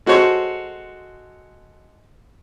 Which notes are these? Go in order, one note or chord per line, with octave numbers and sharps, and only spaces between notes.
G#3 F#4 A4 C5 C#5